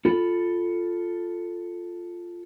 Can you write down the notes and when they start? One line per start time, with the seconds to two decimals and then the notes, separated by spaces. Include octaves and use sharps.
0.05 F4 A4 B5